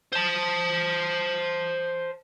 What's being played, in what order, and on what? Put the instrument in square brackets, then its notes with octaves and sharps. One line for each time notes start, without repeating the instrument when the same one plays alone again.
[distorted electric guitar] C5 A5